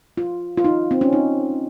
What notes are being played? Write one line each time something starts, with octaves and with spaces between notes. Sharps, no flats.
F4
F4
D#4
C4
C#4
D#4